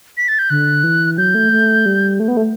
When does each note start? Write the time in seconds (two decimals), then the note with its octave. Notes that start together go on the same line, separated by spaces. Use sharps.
0.17 B6
0.28 A6
0.39 G6
0.50 D3 F#6
0.84 E3
1.18 F#3 G6
1.35 A3
1.52 A3
1.86 G3
2.20 A3
2.28 B3
2.37 A3